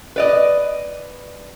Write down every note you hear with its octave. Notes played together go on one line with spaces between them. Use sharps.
B4 D5 D#5